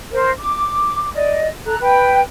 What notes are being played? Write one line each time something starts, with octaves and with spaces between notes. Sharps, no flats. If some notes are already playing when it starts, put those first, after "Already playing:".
A#4 C5
D6
D5 D#5
A4 A#5 F#6
B4 G5